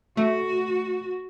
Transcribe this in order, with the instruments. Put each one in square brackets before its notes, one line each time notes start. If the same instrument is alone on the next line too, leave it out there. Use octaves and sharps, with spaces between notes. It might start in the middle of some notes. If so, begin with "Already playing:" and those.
[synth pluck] A3 [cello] F#4